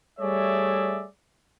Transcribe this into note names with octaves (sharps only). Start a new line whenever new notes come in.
G3 A3 G#4 C#5 D5 E5